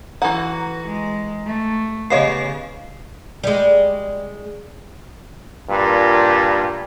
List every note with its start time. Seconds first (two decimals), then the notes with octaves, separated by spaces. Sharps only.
0.22 E3 F#4 A4 F#5 A#5
0.87 G#3
1.46 A3
2.10 C#3 B3 G4 C#5 D#5 F5 C7
3.44 G3 G#3
5.69 G2 A#2